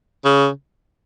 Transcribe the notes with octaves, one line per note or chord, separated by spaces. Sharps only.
C#3